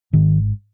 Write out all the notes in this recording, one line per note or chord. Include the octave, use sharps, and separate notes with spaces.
G#1 G#2 D#3